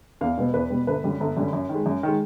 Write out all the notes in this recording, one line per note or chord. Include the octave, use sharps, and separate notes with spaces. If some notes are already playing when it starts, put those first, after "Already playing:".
E2 F5
B2 G3 B3
E2 B4
B2 G3 B3
G1 B4
F#2 D3 G3
G1
F#2 D3 G3
F#2
D#3
G#3
F#2
D#3 G#3